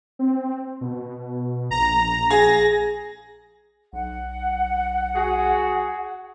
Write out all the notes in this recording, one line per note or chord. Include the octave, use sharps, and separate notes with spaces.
C4
B2
A#1 A#5
G#4 A#6
B1 F#5
F#4 G#4